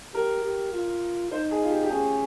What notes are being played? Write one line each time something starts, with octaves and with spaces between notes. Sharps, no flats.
G4 A#4
G4
F4
D#4 C5
G#4
F4
G4
G4
C#4 G#4